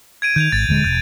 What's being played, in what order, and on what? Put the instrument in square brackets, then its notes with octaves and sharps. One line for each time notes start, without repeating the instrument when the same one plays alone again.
[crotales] G#6 D7 D#7
[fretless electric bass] D#3 [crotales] G6 G#6 F7
[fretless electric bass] G#1 [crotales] A6
[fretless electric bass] D#1 D3 G#3
[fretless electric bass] E1 [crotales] G6